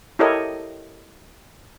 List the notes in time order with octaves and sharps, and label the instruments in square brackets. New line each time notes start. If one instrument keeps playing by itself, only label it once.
[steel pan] E4 G4 A4 A#4 C#5 D#5